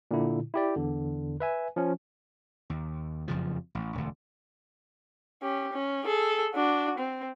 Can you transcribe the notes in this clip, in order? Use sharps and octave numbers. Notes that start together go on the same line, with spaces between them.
A#2 D3 E4
E4 G4 D5
E2 D3
B4 E5 G#5
F3 C#4
D#2
F#1 F2 C#3 F3
A1
E1 D2
C#4 G4
C#4
G#4 A4
D4 F#4
C4